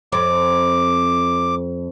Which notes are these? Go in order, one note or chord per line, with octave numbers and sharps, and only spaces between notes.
F2 D6